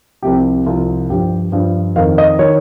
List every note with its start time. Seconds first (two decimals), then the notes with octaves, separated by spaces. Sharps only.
0.23 C2 C3 F3 G4
0.66 C2 C3 F3 F4
1.10 G2 F3 G4
1.52 G2 F3
1.96 F2 D#3 F5
2.18 D#5
2.39 D#3 C#5